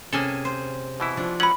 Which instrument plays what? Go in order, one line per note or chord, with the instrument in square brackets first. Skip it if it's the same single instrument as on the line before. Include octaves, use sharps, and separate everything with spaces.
[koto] C3 G#4 G#5 [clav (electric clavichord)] A#3 A4 [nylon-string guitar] C#4
[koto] C5
[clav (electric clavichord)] B2 E3 E4
[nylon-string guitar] F3 [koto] D4
[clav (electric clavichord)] F#3 C#4 F#5 [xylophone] B5 F#7